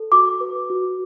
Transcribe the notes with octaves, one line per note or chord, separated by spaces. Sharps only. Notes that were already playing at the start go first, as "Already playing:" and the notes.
Already playing: A4
F#4 D6
B4
F#4